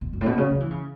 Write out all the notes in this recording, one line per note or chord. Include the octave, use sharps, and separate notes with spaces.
B2
F#2
A2
B2
C#3
F#3
E3
C#3